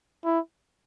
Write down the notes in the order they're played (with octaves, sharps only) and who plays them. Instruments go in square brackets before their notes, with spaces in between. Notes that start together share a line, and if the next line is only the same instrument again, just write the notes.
[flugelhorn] E4